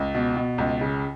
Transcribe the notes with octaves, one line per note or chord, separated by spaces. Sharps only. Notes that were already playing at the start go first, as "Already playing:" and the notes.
Already playing: C#2
B2
B2
C#2
C#3